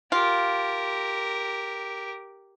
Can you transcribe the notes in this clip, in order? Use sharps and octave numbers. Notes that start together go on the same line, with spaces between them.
F4 G4 A#4